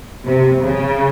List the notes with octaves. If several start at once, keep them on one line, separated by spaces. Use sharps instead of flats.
C3
C#3